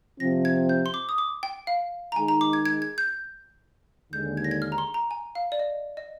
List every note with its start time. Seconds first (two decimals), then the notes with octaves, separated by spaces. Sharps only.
0.20 C3 F3 C4 A#6
0.45 G#6
0.69 G6
0.86 C6
0.94 D6
1.09 D#6
1.18 D6
1.43 G5
1.67 F5
2.12 A#5
2.16 D#3 G#3 D#4 G#4 G#5
2.28 A#5
2.41 D6
2.53 G#6
2.66 G#6
2.82 G#6
2.98 G6
4.13 D#2 D3 G#3 G6
4.37 G#6
4.44 A#6
4.51 G#6
4.62 F6
4.72 A#5
4.78 C6
4.94 A#5
5.11 G#5
5.35 F5
5.52 D5
5.59 D#5
5.97 D#5